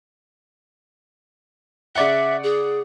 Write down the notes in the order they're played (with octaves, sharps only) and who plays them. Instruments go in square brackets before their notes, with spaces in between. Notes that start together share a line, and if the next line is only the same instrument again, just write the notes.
[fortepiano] C#3 D5 F#5 [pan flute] E5
[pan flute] G#4